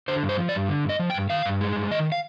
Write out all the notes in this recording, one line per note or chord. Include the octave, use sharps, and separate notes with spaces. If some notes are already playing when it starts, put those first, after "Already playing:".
D3 C5
G2
C5
F3
D5
G2
D3
G2
D#5
F3
G5
G2
D#3 F5
G2
G#3
G2
D#3 D#5
F5